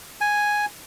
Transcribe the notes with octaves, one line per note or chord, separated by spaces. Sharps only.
G#5